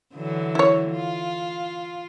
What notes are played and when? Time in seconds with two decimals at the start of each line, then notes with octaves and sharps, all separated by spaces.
0.15 D3 E3 F#3
0.55 E4 C#5
0.91 F4